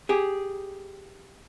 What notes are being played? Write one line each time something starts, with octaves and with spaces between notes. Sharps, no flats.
G4 G#4